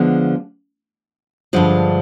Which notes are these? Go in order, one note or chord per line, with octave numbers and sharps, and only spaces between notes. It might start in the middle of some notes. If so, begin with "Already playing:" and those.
Already playing: D3 F3 G#3 B3
G2 D3 F3 G#3